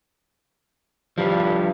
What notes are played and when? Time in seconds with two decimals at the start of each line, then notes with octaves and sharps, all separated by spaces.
1.18 G2 F3 G3